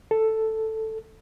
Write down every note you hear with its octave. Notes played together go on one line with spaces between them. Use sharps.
A4